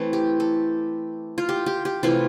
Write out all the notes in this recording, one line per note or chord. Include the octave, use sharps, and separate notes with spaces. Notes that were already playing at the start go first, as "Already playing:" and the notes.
Already playing: E3 A3 C4
G4
A4
F4
G4
G4
G4
C3 E3 A3 E4 F4